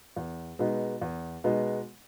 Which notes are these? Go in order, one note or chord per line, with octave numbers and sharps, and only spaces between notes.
E2
B2 G#3 B3 D#4
E2
B2 G#3 B3 D#4